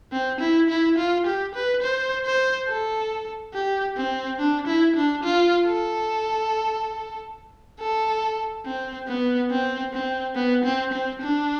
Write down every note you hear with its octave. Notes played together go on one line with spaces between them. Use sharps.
C4
E4
E4
F4
G4
B4
C5
C5
A4
G4
C4
D4
E4
D4
F4
A4
A4
C4
B3
C4
C4
B3
C4
C4
D4